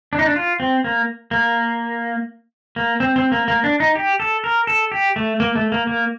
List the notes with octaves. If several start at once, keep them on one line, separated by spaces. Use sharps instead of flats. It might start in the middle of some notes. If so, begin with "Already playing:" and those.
D4
D#4
D4
F4
C4
A#3
A#3
A#3
C4
C4
A#3
A#3
D4
D#4
G4
A4
A#4
A4
G4
A3
A#3
A3
A#3
A#3